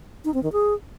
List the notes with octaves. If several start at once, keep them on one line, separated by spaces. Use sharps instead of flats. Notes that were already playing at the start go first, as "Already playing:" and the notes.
D#4
C4
D#3
G#4